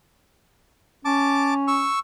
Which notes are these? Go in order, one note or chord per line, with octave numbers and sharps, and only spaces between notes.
C#4 A5 D6
C#6 E6